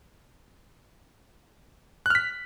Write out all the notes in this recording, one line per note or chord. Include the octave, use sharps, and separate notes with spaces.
F6 F#6 B6